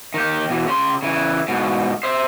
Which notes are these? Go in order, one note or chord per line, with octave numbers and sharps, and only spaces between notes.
D#3 G4
B2 E3
C#3 C6
C#3 E3
G#2 B2
C5 E5